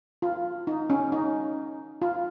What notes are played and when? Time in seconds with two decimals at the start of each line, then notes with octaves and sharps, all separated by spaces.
0.22 F4
0.67 D#4
0.90 C#4
1.12 D#4
2.02 F4